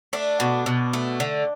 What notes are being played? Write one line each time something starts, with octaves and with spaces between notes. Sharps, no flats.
A3 D4
B2
B2
A3
D3